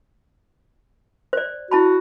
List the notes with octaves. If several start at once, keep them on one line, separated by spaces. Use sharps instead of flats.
C5 D5
E4 F#4 A5 B5